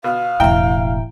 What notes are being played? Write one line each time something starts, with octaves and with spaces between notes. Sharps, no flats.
B2 F5
E1 A2 E4 E5 G5 A#5